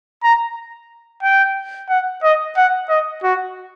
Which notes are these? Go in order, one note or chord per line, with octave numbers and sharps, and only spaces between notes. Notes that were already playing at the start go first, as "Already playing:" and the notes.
A#5
G5
F#5
D#5
F#5
D#5
F#4